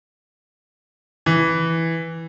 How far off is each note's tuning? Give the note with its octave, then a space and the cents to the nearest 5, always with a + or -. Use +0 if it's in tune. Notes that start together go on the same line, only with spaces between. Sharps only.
E3 -5